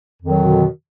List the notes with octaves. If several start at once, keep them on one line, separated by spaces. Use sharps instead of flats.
F2 B2 D3 D#3 F#3